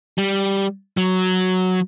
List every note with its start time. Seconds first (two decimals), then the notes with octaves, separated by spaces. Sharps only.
0.18 G3
0.97 F#3